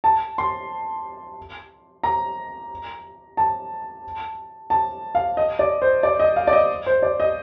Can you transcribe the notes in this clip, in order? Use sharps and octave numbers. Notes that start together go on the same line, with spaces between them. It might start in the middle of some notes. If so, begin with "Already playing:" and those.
A5
C6
A#5
A5
A5
F5
D#5
D5
C5
D5
D#5
F5
D5
D#5
C5
D5
D#5